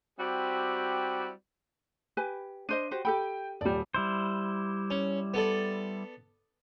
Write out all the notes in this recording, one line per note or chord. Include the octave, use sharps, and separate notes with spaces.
G3 C4 E4 F#4 G4
G4 B4 G#5
D4 C5 D#5 D#7
F#4 G4 C5
G4 A4 G5 B5
D#1 G3 D5
G3 E4 C5
C#4
B3 A4 D5